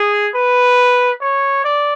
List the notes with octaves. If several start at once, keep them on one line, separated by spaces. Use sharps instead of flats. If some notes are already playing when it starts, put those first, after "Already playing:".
Already playing: G#4
B4
C#5
D5